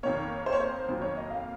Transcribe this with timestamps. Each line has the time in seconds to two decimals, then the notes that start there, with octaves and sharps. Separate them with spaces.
0.03 F2 D#3 A#3 C#5
0.46 C5
0.53 C#5
0.60 C5
0.89 F2 D#3 F#3 A#3
1.02 C#5
1.17 D#5
1.30 F5